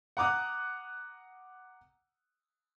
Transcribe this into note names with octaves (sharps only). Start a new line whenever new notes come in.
F#5 A#5 D6 D#6 F#6